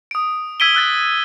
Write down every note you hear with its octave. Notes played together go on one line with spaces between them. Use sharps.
D#6 D7
E6 G#6 B6 D7 D#7 G7
E6 F#6 A6